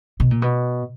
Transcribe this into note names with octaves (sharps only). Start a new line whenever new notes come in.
B2
A#2
B2